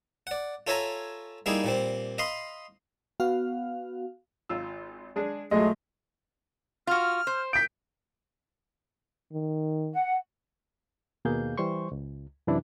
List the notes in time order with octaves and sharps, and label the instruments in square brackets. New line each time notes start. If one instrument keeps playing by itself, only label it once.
[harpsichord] D5 F#5
F4 A4 C#5 E5 G#5 A#5
G3 A#3 D#4 E4 G#4
A#2 G3 C4
D#5 F5 B5 C6 D#6
[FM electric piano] B3 F#4 F5
[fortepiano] G#1 F4 E6
G#3 D4 G#4
[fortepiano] B1 F3 F#3 [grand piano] G#3 D#5 [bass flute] A3
[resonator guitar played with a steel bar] F4 F#4 [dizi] F6
[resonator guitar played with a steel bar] C5
[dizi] G6 [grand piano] B6 D7
[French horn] D#3
[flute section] F#5
[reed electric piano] D#2 B2 A#3 G#4 F5 G6
E3 G3 C5 C6 C#6
C#2
F#2 C3 E3 D4 E4